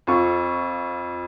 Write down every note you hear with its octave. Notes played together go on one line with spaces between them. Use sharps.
F2 F4 C#6